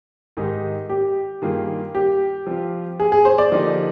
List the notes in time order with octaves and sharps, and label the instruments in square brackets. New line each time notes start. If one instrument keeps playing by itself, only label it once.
[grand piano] G#2 D#3 G#3 D#4 G4
[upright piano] G4
[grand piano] G2 D#3 A#3 F4 G#4
[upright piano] G4
[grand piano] F3 C4 F4
[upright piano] G#4
G#4
C5
D5
[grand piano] D3 F3 A#3 D#4 G4